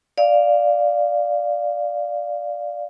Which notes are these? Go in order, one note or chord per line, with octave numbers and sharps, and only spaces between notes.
D5 F5